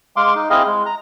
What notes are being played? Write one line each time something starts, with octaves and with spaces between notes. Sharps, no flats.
G#3 F5 C6 D6
D#4
C4 E4 G#4 D#5 F5
G#3
A#5